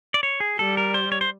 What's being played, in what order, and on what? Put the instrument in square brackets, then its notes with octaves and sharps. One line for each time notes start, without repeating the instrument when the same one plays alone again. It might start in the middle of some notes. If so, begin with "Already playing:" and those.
[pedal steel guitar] D5
C#5
G#4
[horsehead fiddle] G3 [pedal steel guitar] A4
[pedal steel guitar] A#4
C5
C#5
C5